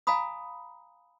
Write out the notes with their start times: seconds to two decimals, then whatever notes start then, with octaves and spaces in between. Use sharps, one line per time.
0.07 F5 G#5 A#5 B5 D#6